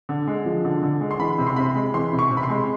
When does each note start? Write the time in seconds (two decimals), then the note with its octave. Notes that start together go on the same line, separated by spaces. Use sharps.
0.09 D3
0.27 G#3
0.46 F3
0.65 D3
0.83 D3
1.01 G#3
1.11 C6
1.19 E3 B5
1.38 C3
1.47 C6
1.56 C3 B5
1.75 G#3
1.94 E3 C6
2.13 C3
2.19 C#6
2.31 C3
2.37 B5
2.43 C6
2.49 G#3